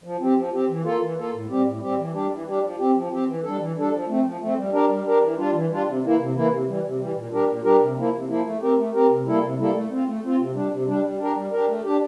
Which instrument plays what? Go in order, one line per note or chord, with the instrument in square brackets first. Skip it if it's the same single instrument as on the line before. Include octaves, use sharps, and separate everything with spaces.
[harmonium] F3
C4 G4
F3
C4 G4
E3
A#3 F4 A4
E3
A#3 F4 A4
A2
G3 C4 G4
A2
G3 C4 G4
E3
G3 D4 G4
E3
G3 D4 G4
F3
C4 G4
F3
C4 G4
E3
G3 D4 A4
E3
G3 D4 A4
F3
A3 C4
F3
A3 C4
G3
D4 G4 A#4
G3
D4 G4 A#4
E3
G3 D4 F4
E3
G3 D4 F4
C3
E3 A#3 E4
C3
E3 A#3 E4
C3
E3 G3
C3
E3 G3
A#2
G3 D4 G4 A#4
A#2
G3 D4 G4 A#4
C3
F3 A#3 E4
C3
F3 A#3 E4
A3
C4 G4 A#4
A3
C4 G4 A#4
C3
G3 A#3 E4 A4
C3
G3 A#3 E4 A4
A3
C4 F4
A3
C4 F4
C3
G3 D4
C3
G3 D4
G3
D4 G4 A#4
G3
D4 G4 A#4
A3
D4 G4